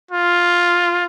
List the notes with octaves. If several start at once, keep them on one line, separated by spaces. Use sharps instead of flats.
F4